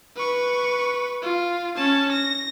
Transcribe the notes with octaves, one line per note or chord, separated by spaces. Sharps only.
B4 C#6
F4
C#4 A5
A#6